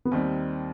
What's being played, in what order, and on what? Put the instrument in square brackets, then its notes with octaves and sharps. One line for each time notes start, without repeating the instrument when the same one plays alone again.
[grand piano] B3
[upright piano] D#2 D#3 G3 [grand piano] C4